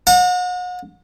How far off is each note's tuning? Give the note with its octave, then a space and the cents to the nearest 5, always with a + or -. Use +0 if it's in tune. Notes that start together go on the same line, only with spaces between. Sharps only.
F#5 -40 A#5 -40